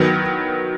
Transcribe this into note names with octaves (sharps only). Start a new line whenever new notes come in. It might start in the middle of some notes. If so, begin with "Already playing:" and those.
Already playing: D#3 F#3 B3